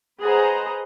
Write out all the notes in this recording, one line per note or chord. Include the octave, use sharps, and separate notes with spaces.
G#4 B4 C5 D#5 F#5 A#5